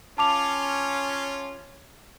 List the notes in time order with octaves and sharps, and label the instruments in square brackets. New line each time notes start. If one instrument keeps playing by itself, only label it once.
[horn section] C#4 F4 [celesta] A5 D6 F7